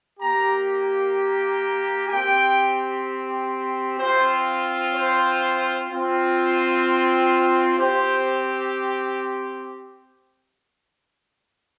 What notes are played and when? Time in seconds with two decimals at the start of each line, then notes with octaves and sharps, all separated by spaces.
0.20 A#3 G4 A#5
2.09 C4 G4 G5
3.98 C4 F4 C5
4.93 C5
5.89 C4 F4
7.77 C4 G4 C5